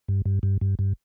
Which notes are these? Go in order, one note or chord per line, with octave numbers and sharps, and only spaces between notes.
G2
G2
G2
G2
G2